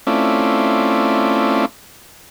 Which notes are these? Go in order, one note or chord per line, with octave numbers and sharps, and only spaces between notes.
A3 C4 C#4 E4 F4 D5